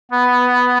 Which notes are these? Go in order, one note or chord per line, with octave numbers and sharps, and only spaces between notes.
B3